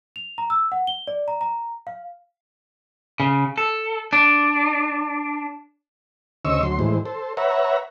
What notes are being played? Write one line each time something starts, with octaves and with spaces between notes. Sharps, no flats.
F7
A#5
E6
F#5
G7
D5
A#5
A#5
F5
C#3
A4
D4
D2 C#3 C5 D#5 C#6 E6
D2 F#3 C6
A2 E3 G#3 C5
A4 C5
B4 C#5 E5 F#5 A#5